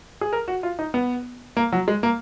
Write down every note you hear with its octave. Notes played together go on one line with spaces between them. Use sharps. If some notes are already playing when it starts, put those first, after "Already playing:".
G#4
A#4
F#4
F4
D#4
B3
A#3
F#3
G#3
A#3